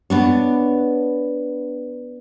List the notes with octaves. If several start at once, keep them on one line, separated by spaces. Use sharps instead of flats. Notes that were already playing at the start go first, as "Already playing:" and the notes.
B3 D4 C#5